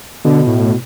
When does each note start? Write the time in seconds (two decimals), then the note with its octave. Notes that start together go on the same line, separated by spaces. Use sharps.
0.25 B2 D3
0.46 A2